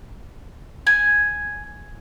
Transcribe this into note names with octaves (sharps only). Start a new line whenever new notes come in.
G#5